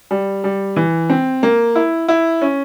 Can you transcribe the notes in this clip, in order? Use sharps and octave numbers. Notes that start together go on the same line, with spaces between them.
G3
G3
E3
C4
A#3
E4
E4
C#4